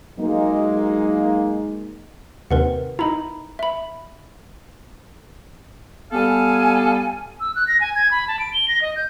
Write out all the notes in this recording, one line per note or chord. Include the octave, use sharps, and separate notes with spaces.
F#3 G#3 A#3 D#4
D#2 C3 A#4 B4 F#5
D#4 E4 A#5 B5
E5 B5
G3 B3 A4 F5 G#5
E6
F#6
A#6
G#5
G#6
B5
A5
D7
G7
A#6
D#5
G6